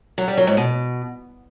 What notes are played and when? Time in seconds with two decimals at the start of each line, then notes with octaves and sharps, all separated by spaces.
0.18 F#3
0.28 G3
0.37 F#3
0.47 G#2
0.57 B2